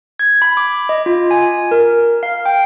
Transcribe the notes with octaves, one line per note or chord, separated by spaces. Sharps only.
G#6
B5
D6
D#5
F4
G#5
A#4
F5
G5